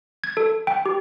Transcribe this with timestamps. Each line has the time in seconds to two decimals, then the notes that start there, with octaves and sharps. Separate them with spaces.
0.24 G#6
0.37 A4
0.67 G5
0.86 G4